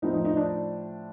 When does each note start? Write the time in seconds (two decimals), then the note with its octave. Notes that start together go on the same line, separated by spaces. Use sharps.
0.02 A2 F3 C4 D#4
0.14 D#4
0.25 D#4
0.37 D4